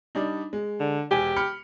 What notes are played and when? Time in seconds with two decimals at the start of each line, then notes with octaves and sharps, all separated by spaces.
0.15 G3 D4 D#4
0.53 G#3
0.80 D3
1.11 E1 G4 G#5
1.36 B5 F6 C#7